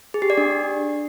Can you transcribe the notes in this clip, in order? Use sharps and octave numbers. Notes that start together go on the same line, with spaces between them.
G#4
G4
D5
D4